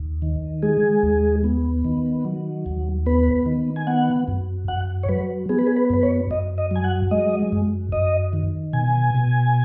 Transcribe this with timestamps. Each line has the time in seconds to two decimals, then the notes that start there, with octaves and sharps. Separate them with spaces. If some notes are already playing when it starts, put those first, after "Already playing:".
Already playing: D#2
0.22 D#3
0.62 G#3 G#4
1.03 D#2
1.44 B3
1.84 D#3
2.25 F#3
2.66 D#2
3.06 B3 B4
3.46 D#3
3.76 G#5
3.87 B3 F#5
4.28 F#2
4.68 F#2 F#5
5.03 C#5
5.09 F#3 B4
5.49 B3 G#4
5.59 B4
5.67 G#4
5.76 B4
5.90 F#2 B4
6.03 C#5
6.31 F#2 D#5
6.58 D#5
6.71 F#3 G#5
6.84 F#5
7.11 G#3 D#5
7.52 F#2
7.92 F#2 D#5
8.33 D#3
8.73 B2 G#5
9.14 B2